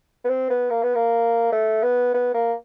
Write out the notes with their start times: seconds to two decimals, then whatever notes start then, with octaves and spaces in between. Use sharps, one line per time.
0.24 B3
0.29 C4
0.50 B3
0.70 A#3
0.83 B3
0.95 A#3
1.52 A3
1.83 B3
2.14 B3
2.34 A#3